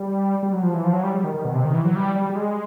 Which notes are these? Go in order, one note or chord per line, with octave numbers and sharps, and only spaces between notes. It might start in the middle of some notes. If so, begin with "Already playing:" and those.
Already playing: G3
G3
F#3
F3
E3
F3
F#3
G3
G3
D#3
D#3
B2
C3
D#3
E3
F#3
G3
G3
G3
G#3